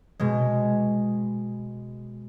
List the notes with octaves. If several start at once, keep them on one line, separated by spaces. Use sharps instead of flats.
B2 G#3